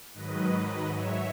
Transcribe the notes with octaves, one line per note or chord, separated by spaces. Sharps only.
G#2 D#3 F#3 B4 D#5
G#2 F#3 C#5 E5